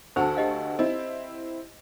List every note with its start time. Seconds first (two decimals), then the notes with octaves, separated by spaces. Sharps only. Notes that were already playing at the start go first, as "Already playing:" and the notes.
0.16 D2 F#4 A4 C5 A5
0.37 G4 D#5 F5
0.79 C4 E4 D#5